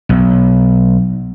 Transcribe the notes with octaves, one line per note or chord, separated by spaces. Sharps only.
B1